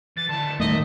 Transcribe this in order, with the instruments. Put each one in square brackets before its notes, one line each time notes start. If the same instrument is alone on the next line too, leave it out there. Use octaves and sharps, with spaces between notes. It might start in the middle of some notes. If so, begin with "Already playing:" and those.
[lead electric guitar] E3 [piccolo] A6
[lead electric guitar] D3 E4 [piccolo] A5 [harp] C6
[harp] D#2 [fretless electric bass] A2 G3 A3 [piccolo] D#5 [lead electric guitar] E5